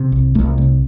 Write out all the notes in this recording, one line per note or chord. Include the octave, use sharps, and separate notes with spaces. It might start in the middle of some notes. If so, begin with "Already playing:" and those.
Already playing: C3
C2
C2 A3
C3